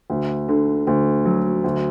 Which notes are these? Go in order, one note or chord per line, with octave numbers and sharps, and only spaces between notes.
D2
D3
D2
F#3
D2